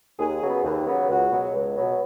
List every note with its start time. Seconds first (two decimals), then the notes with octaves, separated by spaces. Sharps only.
0.18 D#2 G#4
0.41 C#3 F#3 B3
0.64 D#2
0.86 C#3 F#3 B3
1.09 C#2 F#4
1.30 B2 F#3 B3
1.53 C#2
1.76 B2 F#3 B3